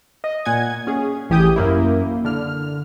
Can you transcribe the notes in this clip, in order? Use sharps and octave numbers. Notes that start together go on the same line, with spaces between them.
D#5
A#2 F#5 G#5 G#6
C#4 G#4
A1 E3 G4 G#5 D#6 G6
F#2 A#3 E4
D3 F6